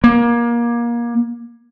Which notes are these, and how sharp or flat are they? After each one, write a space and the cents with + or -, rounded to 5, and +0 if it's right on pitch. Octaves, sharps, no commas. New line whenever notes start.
A#3 +25